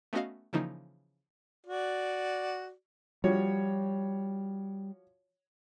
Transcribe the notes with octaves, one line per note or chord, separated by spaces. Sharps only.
A3 B3 C#4 F#4 D#5 F5
C#3 E3 F3 A#3 D#4
F#4 D5
F3 G3 F#4 C#5